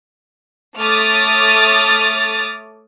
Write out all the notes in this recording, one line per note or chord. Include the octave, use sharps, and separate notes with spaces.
A3 C#5 D6 D#6 F6 A6